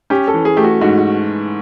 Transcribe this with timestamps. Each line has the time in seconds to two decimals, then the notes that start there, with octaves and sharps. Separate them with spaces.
0.10 C#4 G4
0.28 A4
0.34 E3
0.45 G#4
0.57 A3 G4
0.64 F#4
0.81 G#2 F#4
0.98 F#4